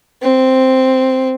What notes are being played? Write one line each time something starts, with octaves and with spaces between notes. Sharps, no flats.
C4